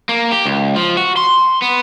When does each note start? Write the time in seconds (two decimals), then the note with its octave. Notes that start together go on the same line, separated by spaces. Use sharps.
0.09 A#3
0.32 G4
0.45 C#2
0.76 F3
0.97 F#4
1.17 C6
1.62 B3